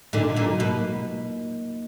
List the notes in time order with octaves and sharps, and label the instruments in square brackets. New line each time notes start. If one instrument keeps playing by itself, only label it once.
[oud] A#2 D3 [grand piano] D#4
[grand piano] D#4
[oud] A#2 D3
[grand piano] F#3
[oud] B2 [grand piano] A#3
[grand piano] F#3
A#3